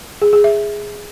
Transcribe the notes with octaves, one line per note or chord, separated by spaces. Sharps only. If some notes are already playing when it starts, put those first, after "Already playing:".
G#4
G#4
E5